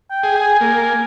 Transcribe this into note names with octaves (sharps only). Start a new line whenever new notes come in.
G5
G#4
G#5
A#3